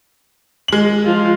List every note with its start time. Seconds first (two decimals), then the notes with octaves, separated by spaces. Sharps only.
0.68 G#3 F#7
1.05 F3 F4